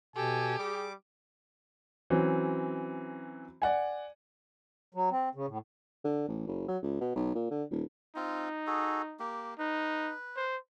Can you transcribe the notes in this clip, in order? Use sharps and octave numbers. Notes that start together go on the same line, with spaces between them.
B2 G4 A4 G#5
G3 G#4 D6
E3 F#3 C4 C#4
D5 F#5 G#5
F#3
C4
C#3
A2
D3
A1
F#1
F#3
C#2
B2
B1
A#2
D3
D#1
C4 D#4 F4
F#4 G#4 A4
A#3 G4
D#4 B4
C5